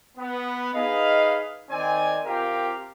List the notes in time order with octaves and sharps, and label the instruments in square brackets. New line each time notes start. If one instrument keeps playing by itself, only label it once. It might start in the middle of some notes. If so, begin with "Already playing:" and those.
[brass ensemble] B3
D#4 G#4 B4 D#5 F5
D#3 C4 D5 G#5
C3 F4 G4 A#4 F5 G5